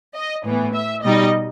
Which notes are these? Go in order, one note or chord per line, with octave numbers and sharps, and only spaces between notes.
D#5
A2 E3 B3
E5
B2 G3 D#4 D#5